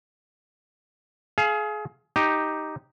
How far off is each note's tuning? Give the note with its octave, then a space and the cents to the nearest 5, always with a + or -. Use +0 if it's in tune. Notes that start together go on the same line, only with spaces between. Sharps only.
G#4 +30 F5 -15
D#4 +0 G4 +0